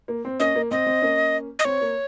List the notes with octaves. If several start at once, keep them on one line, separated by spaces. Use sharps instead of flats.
A#3
C4
A#3 C#4 D#5
A#3
C4 D#5
C4
A#3 C#4
D#5
C4 C#5
A#3